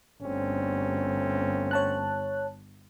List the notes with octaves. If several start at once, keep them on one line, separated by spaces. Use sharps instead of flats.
G1 D2 C4 C#4
C#5 A5 F#6